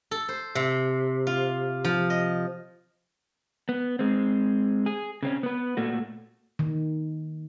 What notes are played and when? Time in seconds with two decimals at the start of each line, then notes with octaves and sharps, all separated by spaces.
0.11 A4
0.29 C5
0.55 C3
1.27 F4
1.84 F3
2.10 D#5
3.69 B3
3.99 G#3 C4
4.86 G#4
5.23 C#3 C4 C#4
5.43 B3 B4
5.77 A#2 A3 F#4
6.59 D#3